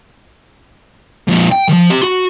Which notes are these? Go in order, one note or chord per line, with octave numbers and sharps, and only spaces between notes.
F2 A#2
G5
D#3 F3
G4 C6
F#4